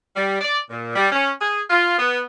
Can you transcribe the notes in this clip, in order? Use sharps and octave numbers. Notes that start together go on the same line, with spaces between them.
G3
D5
A#2
G3
C#4
G#4
F4
B3